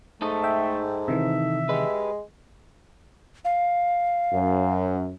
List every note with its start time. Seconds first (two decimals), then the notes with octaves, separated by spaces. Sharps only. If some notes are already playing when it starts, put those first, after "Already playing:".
0.22 G#2 A3 D#4 A4 D#5
0.44 E5 G5
1.08 C3 D#3 E3 E5
1.69 G#3 G4 B4
3.45 F5
4.33 F#2